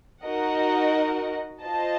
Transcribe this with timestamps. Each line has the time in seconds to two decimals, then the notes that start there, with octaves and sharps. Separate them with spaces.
0.24 D#4 F#4 A#4 D#5 F#5
1.62 F4 C5 D#5 A5